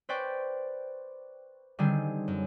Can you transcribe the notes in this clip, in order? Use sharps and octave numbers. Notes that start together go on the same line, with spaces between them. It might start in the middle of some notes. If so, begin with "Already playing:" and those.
B4 C5 D5 G5 C#6
D3 D#3 G3 C4 G#4
F#2